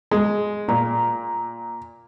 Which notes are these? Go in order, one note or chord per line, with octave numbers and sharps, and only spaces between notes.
G#3
A#2